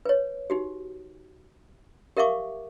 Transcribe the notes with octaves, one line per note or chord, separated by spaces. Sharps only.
B4 C#5
D#4 F#4 G4
G4 A#4 E5 F5 C#6 D6